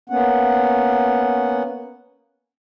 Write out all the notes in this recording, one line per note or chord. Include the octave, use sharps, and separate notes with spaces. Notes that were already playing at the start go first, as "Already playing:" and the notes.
A#3 B3 C#4 F#5